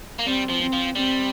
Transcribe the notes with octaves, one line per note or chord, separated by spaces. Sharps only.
A#3
G3 C4
F3
C4
F3
G3 C4